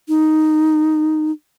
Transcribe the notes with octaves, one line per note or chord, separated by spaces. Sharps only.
D#4